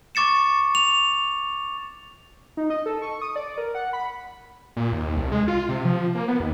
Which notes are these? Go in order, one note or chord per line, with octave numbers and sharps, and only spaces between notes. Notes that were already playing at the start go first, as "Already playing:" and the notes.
C#6 D6 A6 C#7 E7
F7
D#4
D#5
A4
C#6
D#6
D5
A#4
F#5
B5
A#2
D#2
C2
G#3
F4
C3
F3
A#3
B3
D#2